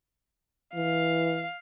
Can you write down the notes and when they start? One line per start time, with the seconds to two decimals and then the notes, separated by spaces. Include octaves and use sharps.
0.75 E3 F5